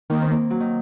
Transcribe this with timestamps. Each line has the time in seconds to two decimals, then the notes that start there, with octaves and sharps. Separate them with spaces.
0.10 D#3 A#3
0.21 C4
0.30 A#3
0.50 F#3
0.60 D#3